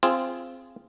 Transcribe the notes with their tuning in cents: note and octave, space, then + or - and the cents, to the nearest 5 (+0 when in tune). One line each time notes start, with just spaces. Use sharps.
C4 +0 F4 -20 G#4 +0